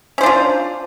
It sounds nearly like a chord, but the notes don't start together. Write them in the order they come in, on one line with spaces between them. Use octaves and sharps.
C#4 C5 D4 F4